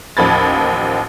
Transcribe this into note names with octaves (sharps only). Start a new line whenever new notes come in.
A1 D#2 F3 B5 G#6 A6